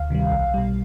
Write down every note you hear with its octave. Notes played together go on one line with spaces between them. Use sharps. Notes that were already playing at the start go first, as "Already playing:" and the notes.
Already playing: D2 F5
C3 D#3 G3
B1
B2 G3